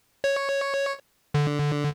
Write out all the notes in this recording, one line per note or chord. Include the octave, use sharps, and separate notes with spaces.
C#5
D3